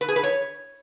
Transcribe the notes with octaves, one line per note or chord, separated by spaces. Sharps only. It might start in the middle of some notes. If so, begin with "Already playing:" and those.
B4
G#4
B4
C#5